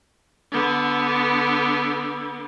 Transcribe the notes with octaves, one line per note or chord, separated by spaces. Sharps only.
D3 B3